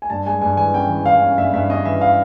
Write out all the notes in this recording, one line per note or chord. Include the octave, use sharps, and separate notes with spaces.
G#5
G2 A5
G#3 G#5
G2 G#5
E3 G#5
C#4 G5
E3
E3 F5
C#4
G2 E5
G2 E5
C#4 D#5
E3 E5
F5